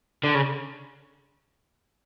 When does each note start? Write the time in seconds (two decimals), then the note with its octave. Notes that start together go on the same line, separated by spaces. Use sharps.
0.24 D3
0.35 C#3